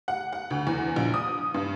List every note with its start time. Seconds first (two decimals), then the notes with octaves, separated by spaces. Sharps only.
0.08 F#5
0.33 F#5
0.50 D2
0.67 E2
0.96 A#1
1.14 D#6
1.54 G2